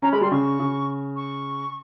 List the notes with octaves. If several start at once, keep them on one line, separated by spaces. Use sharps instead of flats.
C#4 A#5
G#3 B5
G3 C6
C#3 C#6
C#3
C#6